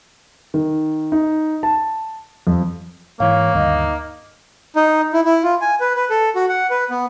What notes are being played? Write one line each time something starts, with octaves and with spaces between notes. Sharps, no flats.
D#3
D#4
A5
F2
G#2 E3 A#3 C#5 F5
D2 G2 D#3 D#4
D#4
E4
E4
F4
G#5
B4
B4
A4
F#4
F#5
B4
B3